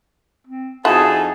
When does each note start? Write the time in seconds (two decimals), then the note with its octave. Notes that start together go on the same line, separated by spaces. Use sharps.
0.47 C4
0.85 F2 D#4 E4 F#4 G#4 A5